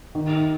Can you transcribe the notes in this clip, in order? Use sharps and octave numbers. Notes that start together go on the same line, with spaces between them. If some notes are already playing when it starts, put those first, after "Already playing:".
D#3